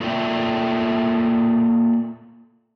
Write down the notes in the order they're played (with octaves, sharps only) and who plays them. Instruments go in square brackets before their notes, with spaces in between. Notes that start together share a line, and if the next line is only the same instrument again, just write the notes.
[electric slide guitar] A#3 F4 A4 D5 E5 G5